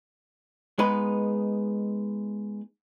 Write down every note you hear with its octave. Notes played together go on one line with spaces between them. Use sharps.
G#3 B3 D#4 B4